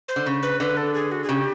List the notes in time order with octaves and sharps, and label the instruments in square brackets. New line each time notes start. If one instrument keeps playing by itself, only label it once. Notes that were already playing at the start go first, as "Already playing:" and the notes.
[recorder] C5
[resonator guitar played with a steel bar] D3
C#3
[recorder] B4
[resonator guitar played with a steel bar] D3 [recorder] B4
[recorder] A4
G#4
F#4
G#4
[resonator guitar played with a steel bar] C#3 [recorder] G4